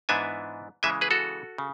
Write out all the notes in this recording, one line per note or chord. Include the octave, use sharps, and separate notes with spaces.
G#2 E3 B3 D4 E5 G#5
C#3 E3 G#3 E5 G#5
G#4 B4
F#4 A4
C#3